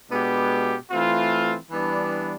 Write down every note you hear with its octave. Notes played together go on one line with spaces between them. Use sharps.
B2 G#3 B3 D4 G4
E3 A3 C4 F4
E3 G3 B3 D4